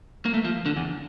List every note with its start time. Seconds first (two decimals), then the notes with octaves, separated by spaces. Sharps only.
0.25 A#3
0.34 A3
0.44 F3
0.66 D3
0.77 E2